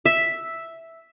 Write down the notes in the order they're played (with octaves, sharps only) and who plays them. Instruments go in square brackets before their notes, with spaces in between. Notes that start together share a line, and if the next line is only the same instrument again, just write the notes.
[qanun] E5